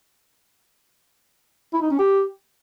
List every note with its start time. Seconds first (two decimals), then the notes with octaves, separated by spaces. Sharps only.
1.74 E4
1.82 D#4
1.91 C#4
1.99 G4